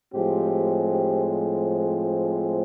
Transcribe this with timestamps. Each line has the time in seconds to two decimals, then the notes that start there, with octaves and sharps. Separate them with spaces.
0.14 A2 F3 G#3 C4 G4
0.90 G4